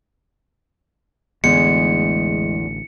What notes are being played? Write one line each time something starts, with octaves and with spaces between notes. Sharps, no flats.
A1 E2 D3 G#3 A3 C#7